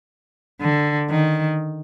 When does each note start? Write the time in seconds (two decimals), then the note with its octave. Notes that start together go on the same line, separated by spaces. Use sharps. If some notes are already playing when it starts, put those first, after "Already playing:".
0.60 D3
1.10 D#3